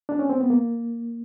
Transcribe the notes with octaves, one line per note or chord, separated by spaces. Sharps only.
D4
C#4
C4
B3
A#3